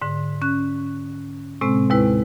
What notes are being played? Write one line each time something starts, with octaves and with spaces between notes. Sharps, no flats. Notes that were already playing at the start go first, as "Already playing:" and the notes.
G#2 D3
C#4 F#6
A2 C3 G#3 C4
D#2 G#3 E4 B4